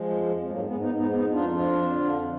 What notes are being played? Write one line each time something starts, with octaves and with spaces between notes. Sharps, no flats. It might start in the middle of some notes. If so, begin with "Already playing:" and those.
Already playing: F3 G#3
F2
F2
G#2 F#3 A#3
G#2 G#3 B3
B3 D#4
G#2
B3 D#4
F2 B3 D#4
F2 D4 F4
F3 D4 F4
F2
D3
F2